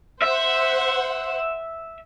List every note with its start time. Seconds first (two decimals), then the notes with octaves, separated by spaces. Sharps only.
0.22 C5 E5 F#5